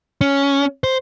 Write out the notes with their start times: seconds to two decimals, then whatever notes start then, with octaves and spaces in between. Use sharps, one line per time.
0.21 C#4
0.84 C5